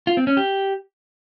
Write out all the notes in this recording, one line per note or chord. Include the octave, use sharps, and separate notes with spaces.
F4
C4
C#4
G4